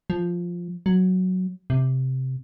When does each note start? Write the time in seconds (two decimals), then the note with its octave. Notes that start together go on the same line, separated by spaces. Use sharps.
0.10 F3
0.86 F#3
1.70 C3